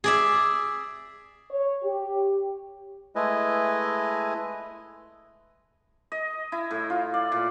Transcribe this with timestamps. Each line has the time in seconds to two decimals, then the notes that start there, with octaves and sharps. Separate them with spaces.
0.04 G#4 D5 E5
1.51 C#5
1.83 G4
3.15 G#3 A3 E4 B4 D#5 G#5
6.12 D#5
6.52 E4
6.71 A2
6.90 F4
7.14 D5
7.32 A#2